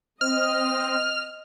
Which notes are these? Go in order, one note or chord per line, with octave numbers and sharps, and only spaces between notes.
C4 D#5 F6